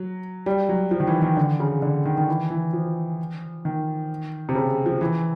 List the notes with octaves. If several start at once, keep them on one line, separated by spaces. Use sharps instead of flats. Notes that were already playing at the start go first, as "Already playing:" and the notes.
Already playing: F#3
G3
F#3
F3
D#3
E3
D#3
D3
C#3
D3
D#3
D#3
E3
E3
F3
D#3
C3
C#3
F3
E3